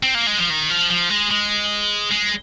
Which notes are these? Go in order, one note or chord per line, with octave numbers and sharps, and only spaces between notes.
C4
A#3
G#3
F3
D#3
F3
F3
G#3
G#3
G#3